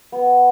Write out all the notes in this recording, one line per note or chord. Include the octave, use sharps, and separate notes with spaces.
B3